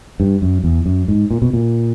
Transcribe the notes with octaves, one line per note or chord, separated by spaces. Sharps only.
G2
F#2
E2
F#2
G#2
A#2
B2
A#2